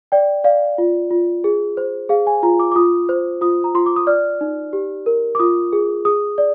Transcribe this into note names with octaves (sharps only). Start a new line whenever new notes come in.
D5 G5
D5 F5
F4
F4
G#4
C5
G#4 F5
G#5
F4 A#5
D6
D6
F4 D#6
C5
F4 D#6
A#5
F4 C6
D6
D#6
D5 F6
D#4
G4
A#4
D6
F4 D#6
G#4
G#4 D#6
D5